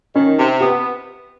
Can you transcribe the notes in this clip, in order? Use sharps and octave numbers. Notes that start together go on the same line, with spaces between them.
D#3 C#4
C3
B3 G4